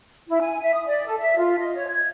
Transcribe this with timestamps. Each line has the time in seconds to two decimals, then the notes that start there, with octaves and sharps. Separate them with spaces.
0.29 E4
0.41 G#5
0.62 E5
0.74 D#6
0.86 D5
1.06 A4
1.19 E5
1.37 F4
1.59 D#5
1.75 C#5
1.88 G#6